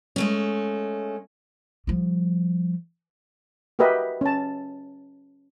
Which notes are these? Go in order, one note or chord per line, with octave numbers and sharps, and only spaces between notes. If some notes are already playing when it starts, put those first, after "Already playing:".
G#3 A3 C#4
F3 G3
F#4 G4 A#4 B4 D#5 E5
C#4 A5